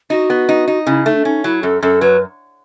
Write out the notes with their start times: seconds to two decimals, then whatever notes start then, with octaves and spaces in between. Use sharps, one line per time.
0.10 D#4 F#4
0.30 B3
0.49 D#4
0.68 D#4
0.86 C#3 E4
1.06 A3 D#4
1.15 D4
1.25 C#4 D#4
1.44 F#3 E4
1.63 F#2 A4
1.82 F#2 A4
2.01 F#3 B4